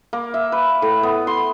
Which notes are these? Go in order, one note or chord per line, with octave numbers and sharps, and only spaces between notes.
A#3
E5
B4
A2
B3
C6